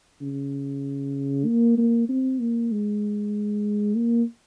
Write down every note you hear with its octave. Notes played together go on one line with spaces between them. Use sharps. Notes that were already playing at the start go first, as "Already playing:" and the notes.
C#3
A#3
A#3
C4
A#3
G#3
A#3